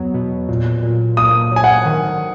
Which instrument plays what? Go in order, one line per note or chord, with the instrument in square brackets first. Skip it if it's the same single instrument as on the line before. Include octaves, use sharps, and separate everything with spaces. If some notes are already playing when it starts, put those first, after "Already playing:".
Already playing: [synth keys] E2 F#3 B3
B2
A#2
A#2
[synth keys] A#3 [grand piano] D#6
[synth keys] F#3 [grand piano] G#5
[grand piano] F#5
[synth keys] D#3